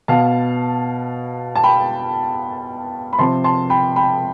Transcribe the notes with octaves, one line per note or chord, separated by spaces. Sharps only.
B2 B3 F5 A5
A5
G5 B5
B5
C3 F3 C4 A5 C6
A5 C6
G5 B5
G5 B5